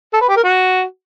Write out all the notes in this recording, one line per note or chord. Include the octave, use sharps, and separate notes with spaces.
A4
B4
G4
A#4
F#4